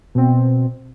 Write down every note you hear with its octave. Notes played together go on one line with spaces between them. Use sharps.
B2 C4